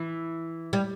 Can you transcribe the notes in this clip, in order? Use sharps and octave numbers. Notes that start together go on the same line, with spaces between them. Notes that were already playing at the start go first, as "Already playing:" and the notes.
Already playing: E3
G3